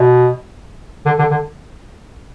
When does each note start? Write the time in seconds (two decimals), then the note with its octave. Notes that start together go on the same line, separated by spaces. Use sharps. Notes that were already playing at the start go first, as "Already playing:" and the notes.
Already playing: B2
1.05 D3
1.18 D3
1.31 D3